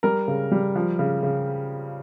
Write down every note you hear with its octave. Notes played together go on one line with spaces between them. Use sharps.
G3 A#4
C#3
G3
F3
C#3
C#3